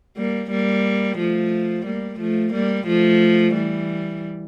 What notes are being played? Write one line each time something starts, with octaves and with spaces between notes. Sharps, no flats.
G3 A#3
G3 A#3
F3 A3
G3 A#3
F3 A3
G3 A#3
F3 A3
E3 G3